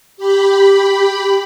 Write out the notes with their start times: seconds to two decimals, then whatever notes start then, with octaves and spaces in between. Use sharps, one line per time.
0.17 G4 B5